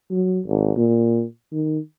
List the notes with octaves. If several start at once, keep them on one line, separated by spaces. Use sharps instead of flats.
F#3
G#1
A#2
D#3